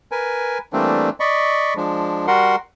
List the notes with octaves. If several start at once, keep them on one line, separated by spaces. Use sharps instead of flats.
A#4 B4 G#5
E3 G3 A3 A#3 C4 D4
D5 D#5 B5 C#6
F3 G#3 D4
G3 F#4 A#4 F#5 C6